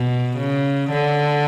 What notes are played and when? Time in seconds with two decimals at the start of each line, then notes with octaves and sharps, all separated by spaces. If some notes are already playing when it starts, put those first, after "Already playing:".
Already playing: B2
0.38 C#3
0.91 D3